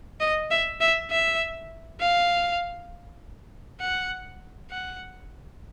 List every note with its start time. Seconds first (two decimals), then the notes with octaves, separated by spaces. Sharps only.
0.20 D#5
0.51 E5
0.81 E5
1.11 E5
2.00 F5
3.81 F#5
4.71 F#5